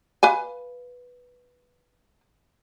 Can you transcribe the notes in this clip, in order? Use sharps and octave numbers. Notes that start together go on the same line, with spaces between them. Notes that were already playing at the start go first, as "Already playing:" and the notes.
B4 F5 G#5